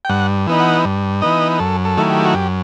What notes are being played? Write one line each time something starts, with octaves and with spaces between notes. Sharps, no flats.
G5
G2 F#5
E3 B3 D#4
F#5
G2
E3 B3 D#4 D#5
F#2 A4
A4
D#3 F#3 A3 E4
G4
F#4
F#2 G4